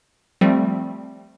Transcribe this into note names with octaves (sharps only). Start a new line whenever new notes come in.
F3 G3 A3 C4